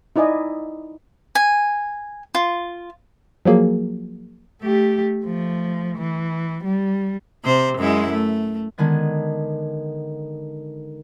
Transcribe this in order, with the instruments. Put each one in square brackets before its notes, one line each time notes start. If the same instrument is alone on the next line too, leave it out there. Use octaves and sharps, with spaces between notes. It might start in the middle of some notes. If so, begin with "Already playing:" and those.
[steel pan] D#4 E4 D5 D#5 G#5
[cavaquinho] G#5
F4
[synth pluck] F3 F#3 A#3 G#4
[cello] A3 G4
F3 A3
E3
G3
[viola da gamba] C3 C5
F#2 G#3 E4
A3
[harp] D3 D#3 G#3 B3 G#6